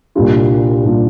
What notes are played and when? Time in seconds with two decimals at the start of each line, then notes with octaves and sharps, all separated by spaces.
0.15 C2 A#2 G3 D4 F4
0.84 A#2 G3 D4 F4